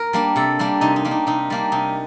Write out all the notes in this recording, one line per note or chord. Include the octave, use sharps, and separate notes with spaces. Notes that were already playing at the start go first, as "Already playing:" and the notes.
Already playing: A#4
G3 A#3 D4
C3 A4
G3 A#3 D4
C3 D#4
D#4
G3 A#3 D4
D#4
C3 D#4
G3 A#3 D4
C3 D#4